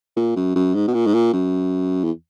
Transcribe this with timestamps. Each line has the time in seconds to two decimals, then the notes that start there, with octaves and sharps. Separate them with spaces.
0.16 A#2
0.36 F#2
0.56 F#2
0.75 G#2
0.88 B2
0.94 A#2
1.07 G#2
1.14 A#2
1.33 F#2
2.04 E2